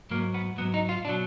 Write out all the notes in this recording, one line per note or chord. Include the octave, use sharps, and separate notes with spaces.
G#2 F#3 A#3
B3
G#2 F#3 B3
D#4
F4
B2 F#3 D4